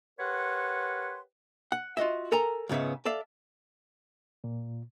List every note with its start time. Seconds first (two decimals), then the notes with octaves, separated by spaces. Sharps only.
0.20 G4 A#4 B4 C#5 F#5 C6
1.72 F#5
1.97 F4 F#4 D#5 E5
2.32 A4 A#4 G#5 A#5
2.69 C#2 G#2 C#3 B3 E5
3.05 A4 D5 E5 F5
4.44 A#2